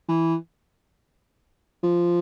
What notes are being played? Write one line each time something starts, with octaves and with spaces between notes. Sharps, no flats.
E3
F3